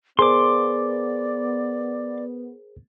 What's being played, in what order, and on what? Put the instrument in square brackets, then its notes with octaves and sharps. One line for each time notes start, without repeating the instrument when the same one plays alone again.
[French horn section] B3 [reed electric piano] G#4 A#4 C5 [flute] D5 [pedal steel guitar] C6 D6